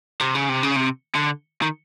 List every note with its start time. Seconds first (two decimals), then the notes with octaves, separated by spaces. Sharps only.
0.21 C3
0.35 C#3
0.49 C3
0.63 C#3
0.76 C3
1.15 D3
1.62 D#3